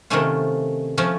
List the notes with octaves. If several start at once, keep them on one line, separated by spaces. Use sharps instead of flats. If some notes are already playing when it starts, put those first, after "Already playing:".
C3 D#3 A3 C#4 F4
F3 A3 C#4 F4